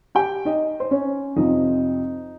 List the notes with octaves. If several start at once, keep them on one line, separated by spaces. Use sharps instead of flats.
G4 G5
D#4 D#5
C5
C#4 C#5
F2 C3 F3 D#4